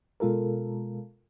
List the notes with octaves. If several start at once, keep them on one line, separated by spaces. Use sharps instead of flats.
B2 G#3 F4 A4 A#4